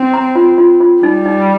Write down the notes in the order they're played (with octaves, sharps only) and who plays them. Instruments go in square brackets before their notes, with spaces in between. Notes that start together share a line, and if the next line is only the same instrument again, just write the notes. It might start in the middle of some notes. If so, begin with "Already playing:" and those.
Already playing: [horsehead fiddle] C4
[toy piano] A#5
F4
F4
F4
[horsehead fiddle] G3 [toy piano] D#4
[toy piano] D#4